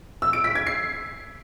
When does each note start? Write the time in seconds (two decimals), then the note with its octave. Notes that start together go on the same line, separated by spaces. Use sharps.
0.22 E6
0.33 D7
0.44 B6
0.55 G#6
0.67 C7